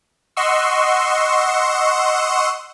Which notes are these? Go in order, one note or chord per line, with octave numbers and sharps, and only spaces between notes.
D#5 F#5 C6 C#6 E6